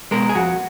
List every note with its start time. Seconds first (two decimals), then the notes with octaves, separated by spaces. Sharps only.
0.11 B2 G#3 A#4
0.29 G#4
0.35 F2 F#4